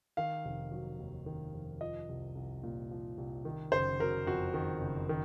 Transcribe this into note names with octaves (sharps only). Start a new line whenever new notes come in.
D#3 F5
F1
F#3
D#2
D#3
F1
F3 D#5
C2
C2
A#2
F3
C2
D#3
F#1 C5
F#3 A#4
F2 F#4
D#3
F#1
D#3